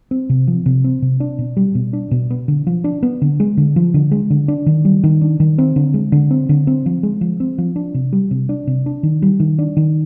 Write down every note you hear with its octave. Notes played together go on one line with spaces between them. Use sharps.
C4
C3
F3
C3
C4
C3
D4
B2
G3
B2
D4
B2
B3
D3
F3
D4
B3
D3
G#3
D3
F3
D3
G#3
D3
D4
D#3
G3
D#3
D4
D#3
C4
D3
G#3
D3
C4
D3
C4
F3
G#3
F3
C4
F3
D4
C3
G3
C3
D4
C3
D4
D#3
G3
D#3
D4
D#3